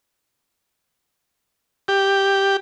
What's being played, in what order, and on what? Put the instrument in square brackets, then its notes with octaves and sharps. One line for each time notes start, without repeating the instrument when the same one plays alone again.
[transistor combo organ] G4